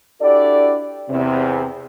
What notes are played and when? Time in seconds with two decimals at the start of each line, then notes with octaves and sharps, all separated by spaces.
0.22 D4 E4 F#4 G4 A4 D5
1.10 E2 C3